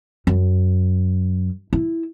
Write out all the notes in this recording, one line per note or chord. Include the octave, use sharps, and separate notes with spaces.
F#2
E4